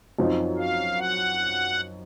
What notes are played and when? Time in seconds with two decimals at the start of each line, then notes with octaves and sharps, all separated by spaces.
0.19 F#2 F3 C4 D#4
0.58 F5
0.98 F#5